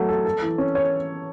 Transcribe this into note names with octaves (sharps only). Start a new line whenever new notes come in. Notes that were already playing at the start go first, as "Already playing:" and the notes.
Already playing: F#3 A3
A4
A4
E3
C#4
C#5